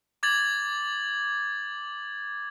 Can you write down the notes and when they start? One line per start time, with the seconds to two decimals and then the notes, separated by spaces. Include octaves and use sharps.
0.23 D6 G#6 A6 F#7